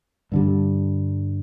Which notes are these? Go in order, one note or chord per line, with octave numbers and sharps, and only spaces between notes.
G2 D3 G3